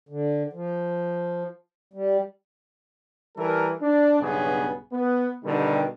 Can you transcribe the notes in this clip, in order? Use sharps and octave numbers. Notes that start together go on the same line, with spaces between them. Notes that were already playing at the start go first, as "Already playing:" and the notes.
D3
F3
G3
E3 G3 A4 A#4
D4
B1 G2 C#3 B3 G#4
B3
B2 D3 D#3 G3